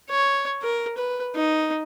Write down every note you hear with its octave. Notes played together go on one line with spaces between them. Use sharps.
C#5
A#4
B4
D#4